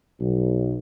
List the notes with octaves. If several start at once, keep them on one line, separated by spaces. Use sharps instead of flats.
B1